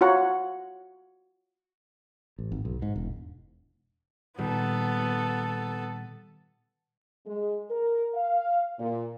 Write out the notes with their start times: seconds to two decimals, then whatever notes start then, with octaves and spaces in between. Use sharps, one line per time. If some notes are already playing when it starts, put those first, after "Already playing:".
0.01 F4 F#4 C#5 F#5 A#5
2.38 A1
2.52 G#1
2.65 B1
2.82 G#2
2.96 E1
4.39 A#2 D#3 G3 B3 A4
7.26 G#3
7.70 A#4
8.15 F5
8.79 A#2